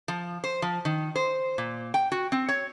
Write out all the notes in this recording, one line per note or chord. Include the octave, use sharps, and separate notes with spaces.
F3
C5
F3
D#3
C5
A#2
G5
F#4
C4
C#5